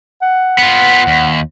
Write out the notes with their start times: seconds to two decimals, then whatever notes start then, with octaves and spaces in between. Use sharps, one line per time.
0.22 F#5
0.58 B3 F4
1.07 D#2